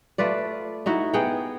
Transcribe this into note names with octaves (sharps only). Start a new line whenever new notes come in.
A3 F4 B4 D5
D#4 E4 F#4
B3 G#4 F#5 G5